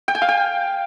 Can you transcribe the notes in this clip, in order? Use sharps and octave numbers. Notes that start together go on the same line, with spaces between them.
G5
G#5
F5
G5